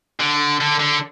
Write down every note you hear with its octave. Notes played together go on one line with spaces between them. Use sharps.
D3
D3
D3